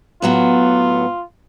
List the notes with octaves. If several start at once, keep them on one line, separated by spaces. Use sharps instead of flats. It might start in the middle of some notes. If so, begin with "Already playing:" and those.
A2 F#3 B3 F4